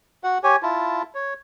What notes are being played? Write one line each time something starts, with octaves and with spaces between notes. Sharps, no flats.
F#4 F#5
G4 C#5 G#5
E4 F4 A5
C#5